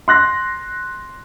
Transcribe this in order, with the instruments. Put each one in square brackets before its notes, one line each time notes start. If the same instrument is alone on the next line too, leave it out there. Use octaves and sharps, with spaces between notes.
[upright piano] C6 F#6 A#6